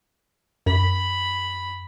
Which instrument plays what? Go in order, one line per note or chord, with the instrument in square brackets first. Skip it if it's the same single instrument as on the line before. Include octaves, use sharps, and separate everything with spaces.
[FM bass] F#2 [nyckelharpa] B5